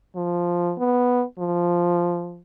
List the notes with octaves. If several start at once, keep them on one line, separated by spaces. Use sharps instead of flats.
F3
B3
F3